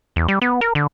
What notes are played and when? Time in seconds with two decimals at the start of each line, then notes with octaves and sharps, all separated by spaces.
0.16 E2
0.28 G3
0.42 B3
0.61 A#4
0.75 D3